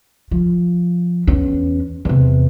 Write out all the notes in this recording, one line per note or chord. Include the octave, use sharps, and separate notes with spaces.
F3
E2 C#4
E2 C3